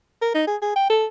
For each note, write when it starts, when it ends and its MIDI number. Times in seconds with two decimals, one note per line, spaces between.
0.22 0.30 70
0.34 0.47 63
0.47 0.56 68
0.62 0.74 68
0.75 0.88 79
0.90 1.06 69